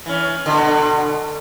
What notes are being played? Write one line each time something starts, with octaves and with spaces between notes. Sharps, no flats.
E3 C#4
B2 D3